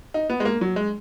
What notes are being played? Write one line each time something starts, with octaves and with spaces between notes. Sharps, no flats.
D#4
B3
G#3
A#3
F#3
G#3